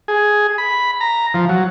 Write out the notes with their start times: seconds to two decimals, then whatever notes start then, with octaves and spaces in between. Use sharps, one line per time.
0.08 G#4
0.58 B5
1.01 A#5
1.34 F3
1.49 F#3